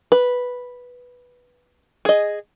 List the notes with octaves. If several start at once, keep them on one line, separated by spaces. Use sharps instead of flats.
B4
G#4 D#5